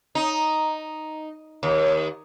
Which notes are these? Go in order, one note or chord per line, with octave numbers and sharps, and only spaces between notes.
D#4
D#2